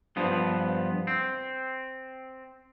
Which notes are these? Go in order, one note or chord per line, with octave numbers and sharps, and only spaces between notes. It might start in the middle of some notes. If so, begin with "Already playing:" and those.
G2 F3 B3
C4